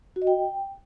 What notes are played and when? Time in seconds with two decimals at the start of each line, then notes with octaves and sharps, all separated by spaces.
0.16 F#4
0.22 D#5
0.27 G5